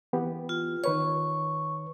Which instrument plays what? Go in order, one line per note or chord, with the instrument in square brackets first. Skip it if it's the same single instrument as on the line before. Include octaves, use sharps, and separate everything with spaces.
[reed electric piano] E3 B3 G4
[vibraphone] F4
[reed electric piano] D#3 B4 C#5 [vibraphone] C#6